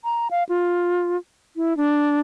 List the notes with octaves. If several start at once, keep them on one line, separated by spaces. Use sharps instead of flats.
A#5
F5
F4
E4
D4